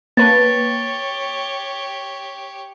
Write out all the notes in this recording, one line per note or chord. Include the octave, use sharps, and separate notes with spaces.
A#3 G4 B4 C#5 A5 A6